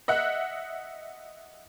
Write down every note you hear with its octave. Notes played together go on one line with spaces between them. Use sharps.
D#5 E5 F#5 F#6